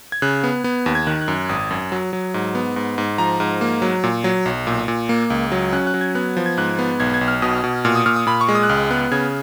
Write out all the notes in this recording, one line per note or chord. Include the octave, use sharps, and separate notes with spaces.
G#6
C#3 F#6
B3
B3
D#2
G#6
D#3 F#6
F#6
F#2
G#1 D#6
F#2
F#3
F#3
G#2
B3
G#2
G#2
F3 A#5
G#2
A#3
F#3
A#2
F#3
B1
A#2
A#2
A#3
C#2
F#3
C#4 F#6
F#6
F#3
G#6
B3 F#6
F3
G#6
G#2 F#6
B3
B1 G#6
G#6
B1
F6
B2 D#6
B2
A#2 F6
D#6
A#2 F6
D#6
A#2 B5
C#6
G#3
D#6
F#6
C#2 F6
B3 F#6
C#3 G#6